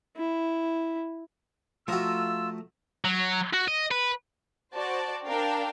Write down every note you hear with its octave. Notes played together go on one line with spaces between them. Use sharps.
E4
F3 A3 F4 F#4 E5 A#5 E6
F#3
F#4
D#5
B4
F#4 C5 D5 A5
D4 A#4 F5 G5